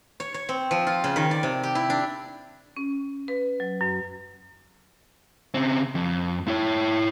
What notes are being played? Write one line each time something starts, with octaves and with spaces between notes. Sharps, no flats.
C#5
C#5
C4
F3
F4
C#3
D#3
D5
C3
G4
E4
D4
C#4
B4
F#3
F#2
C#3 C4
F2
E4 C#5